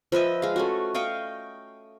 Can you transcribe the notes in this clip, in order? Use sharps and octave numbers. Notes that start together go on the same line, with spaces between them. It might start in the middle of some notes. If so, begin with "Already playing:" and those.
F3 B4 D#5 E5
G#3 F5
A3 C#4 F#4
D#5 F5 G5 C#6